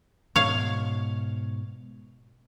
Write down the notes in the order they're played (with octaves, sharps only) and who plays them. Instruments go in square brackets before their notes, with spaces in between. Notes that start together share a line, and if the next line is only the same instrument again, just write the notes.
[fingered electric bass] G#2 B2 [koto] C#5 F5